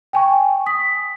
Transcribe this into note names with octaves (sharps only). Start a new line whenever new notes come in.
G5 G#5 C#6
D#6 B6